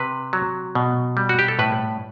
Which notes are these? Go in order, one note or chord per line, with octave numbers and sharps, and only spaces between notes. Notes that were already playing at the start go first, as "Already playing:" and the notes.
Already playing: C3 B4
F#3
B2
G3
F#4
G4
A4
A2 B4